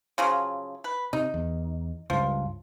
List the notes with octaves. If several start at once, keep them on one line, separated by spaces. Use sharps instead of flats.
C#3 F3 F#3
B4
C3 D#4
E2
C#2 G2 F3